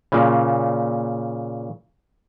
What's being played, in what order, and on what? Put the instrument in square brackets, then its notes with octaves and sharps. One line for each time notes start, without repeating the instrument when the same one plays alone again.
[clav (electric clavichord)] A#2 C#3